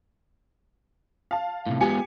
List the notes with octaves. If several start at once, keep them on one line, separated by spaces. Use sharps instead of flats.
F5 A5
A2 C3
G#3 B3 F4 G4 G#5 C#7